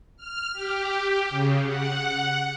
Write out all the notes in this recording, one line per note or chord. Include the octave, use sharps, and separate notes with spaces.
F6
G4
C#3
F#5